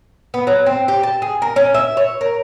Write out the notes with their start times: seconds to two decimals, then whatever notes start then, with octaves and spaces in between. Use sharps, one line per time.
0.34 B3
0.47 F#3
0.66 C4
0.88 G4
1.03 A5
1.22 G#4
1.42 A#4
1.56 C#4
1.74 E5
1.97 C#5
2.21 A#4